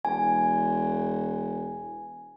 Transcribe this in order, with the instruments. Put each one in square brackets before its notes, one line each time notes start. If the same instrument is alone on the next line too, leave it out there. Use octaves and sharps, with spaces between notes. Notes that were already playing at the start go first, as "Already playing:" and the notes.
[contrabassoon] E1 [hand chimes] G#5